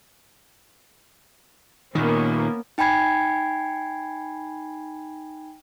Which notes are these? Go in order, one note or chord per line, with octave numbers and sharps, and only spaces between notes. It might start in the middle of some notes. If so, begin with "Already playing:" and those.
A#2 D#3 A#3 B3 C#4
D#4 G5 G#5 B5 G#6 C7